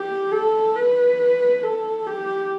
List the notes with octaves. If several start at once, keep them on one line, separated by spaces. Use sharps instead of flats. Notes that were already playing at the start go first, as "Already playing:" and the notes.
Already playing: G4
A4
B4
A4
G4